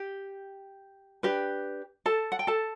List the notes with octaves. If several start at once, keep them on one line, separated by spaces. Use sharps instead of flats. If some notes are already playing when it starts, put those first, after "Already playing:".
Already playing: G4 G5
D4 G4 B4
A4 A5
F#5
G5
A4 A5